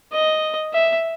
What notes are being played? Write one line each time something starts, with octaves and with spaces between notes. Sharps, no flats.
D#5
E5